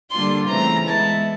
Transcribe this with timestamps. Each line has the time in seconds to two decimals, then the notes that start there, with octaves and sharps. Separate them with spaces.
0.12 D3 G3 A#3 D4 F4 C6
0.50 C#3 E3 A3 C4 A#5
0.88 E3 G#3 B3 E4 A5